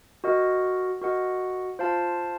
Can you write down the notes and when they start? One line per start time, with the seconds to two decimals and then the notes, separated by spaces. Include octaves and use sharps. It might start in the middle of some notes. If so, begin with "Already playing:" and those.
0.24 F#4 A#4 D#5 F#5
1.01 F#4 A#4 D#5 F#5
1.79 F4 C5 F5 A5